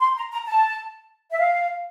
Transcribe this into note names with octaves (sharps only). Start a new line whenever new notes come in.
C6
A#5
A#5
A5
E5
F5